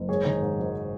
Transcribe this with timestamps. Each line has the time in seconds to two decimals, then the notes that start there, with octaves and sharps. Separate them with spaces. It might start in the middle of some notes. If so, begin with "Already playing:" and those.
Already playing: F#1
0.09 G#1 G#4 C#5
0.25 D#3 D#4 G#4
0.42 G#2
0.59 G#1